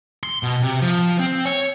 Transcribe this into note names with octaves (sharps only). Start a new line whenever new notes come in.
C6
B2
C3
F3
C4
C#5